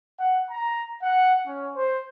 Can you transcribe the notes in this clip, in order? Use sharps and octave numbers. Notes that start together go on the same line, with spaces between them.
F#5
A#5
F#5
C#4
C5